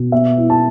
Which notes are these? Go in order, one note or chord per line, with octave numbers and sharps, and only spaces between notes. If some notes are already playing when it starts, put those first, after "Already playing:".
Already playing: B2
B3 E5
E4
A5